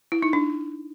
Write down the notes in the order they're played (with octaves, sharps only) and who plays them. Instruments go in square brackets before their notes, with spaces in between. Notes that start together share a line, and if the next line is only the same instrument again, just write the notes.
[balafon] E4
D#4
D4